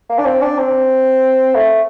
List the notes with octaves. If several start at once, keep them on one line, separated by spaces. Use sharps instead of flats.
A#3
D4
C4
D4
C4
A3